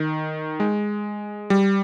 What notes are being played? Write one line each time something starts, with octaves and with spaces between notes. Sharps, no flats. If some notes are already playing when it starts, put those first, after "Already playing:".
Already playing: D#3
G#3
G3